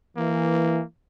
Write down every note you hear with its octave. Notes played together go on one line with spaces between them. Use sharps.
E3 A#3